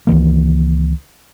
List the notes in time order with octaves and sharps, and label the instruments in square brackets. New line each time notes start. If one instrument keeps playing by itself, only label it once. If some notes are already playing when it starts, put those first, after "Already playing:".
[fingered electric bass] C#2 D#3 E3 A#3